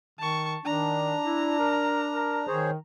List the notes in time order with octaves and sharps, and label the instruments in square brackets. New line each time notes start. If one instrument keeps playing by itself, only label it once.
[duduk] D#3 [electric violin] A5 C#6
[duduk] D#3 [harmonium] D4 [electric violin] A#5
[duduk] E4
A#4
A#4
[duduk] D#3 [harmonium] G#4 C5 C#5